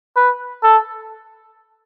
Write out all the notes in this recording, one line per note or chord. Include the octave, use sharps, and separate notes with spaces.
B4
A4